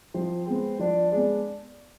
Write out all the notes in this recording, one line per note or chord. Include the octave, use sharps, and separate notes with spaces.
F3 C4
G#3 B3 C4
F3 D4
G#3 D4
B3